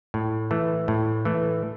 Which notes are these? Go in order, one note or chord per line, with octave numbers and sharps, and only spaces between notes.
A2
E3 A3
A2
E3 A3